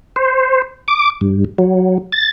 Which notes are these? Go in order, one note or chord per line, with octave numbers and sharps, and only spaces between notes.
C5
D6
G2
F#3
A6